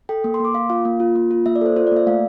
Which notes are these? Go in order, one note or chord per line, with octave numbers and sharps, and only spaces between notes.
A4 G5
A#3
C6
A#3 D6
A#3 F5
F4 F5
A#3
F4
A#3
F4
A#3 E5
D5
A4 C5
F4 C5
D5
A#3 E5
A3 F5